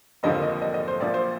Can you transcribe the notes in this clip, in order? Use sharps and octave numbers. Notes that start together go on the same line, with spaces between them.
F1 D#2 D3 F3 A#3 D#5
D#5
D#5
D#5
C5
A#1 A#2 F3 D5
C5